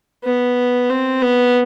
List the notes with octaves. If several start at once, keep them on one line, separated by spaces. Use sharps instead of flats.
B3
C4
B3